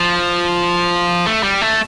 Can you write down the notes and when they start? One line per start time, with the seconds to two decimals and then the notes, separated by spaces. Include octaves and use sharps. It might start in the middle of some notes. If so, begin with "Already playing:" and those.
Already playing: F3
1.26 A3
1.43 G3
1.62 A3